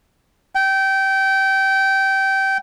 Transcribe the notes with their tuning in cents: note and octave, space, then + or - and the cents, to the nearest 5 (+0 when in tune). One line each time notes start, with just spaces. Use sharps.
G5 -20